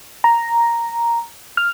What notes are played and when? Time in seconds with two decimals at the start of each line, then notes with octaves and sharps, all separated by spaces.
0.24 A#5
1.57 F6